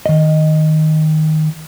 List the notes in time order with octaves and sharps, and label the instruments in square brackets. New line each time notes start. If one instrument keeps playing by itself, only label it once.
[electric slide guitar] D#3 D#5